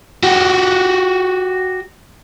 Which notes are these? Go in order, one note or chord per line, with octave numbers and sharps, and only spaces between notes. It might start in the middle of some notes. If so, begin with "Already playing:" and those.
F#4 G4